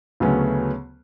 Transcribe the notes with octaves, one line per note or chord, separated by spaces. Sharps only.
D2 C#3 F#3 A3 B3 C#4